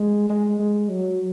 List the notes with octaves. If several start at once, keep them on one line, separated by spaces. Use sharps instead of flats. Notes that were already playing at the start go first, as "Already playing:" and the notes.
Already playing: G#3
G#3
G#3
F#3